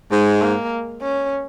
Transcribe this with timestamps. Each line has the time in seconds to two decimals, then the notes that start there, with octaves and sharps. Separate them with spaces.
0.11 G#2 G#3
0.42 A#3
1.02 C#4